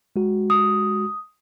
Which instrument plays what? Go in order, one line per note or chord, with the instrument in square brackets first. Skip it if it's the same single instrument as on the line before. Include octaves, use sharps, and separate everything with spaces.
[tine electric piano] G#3 F#4
[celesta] D#6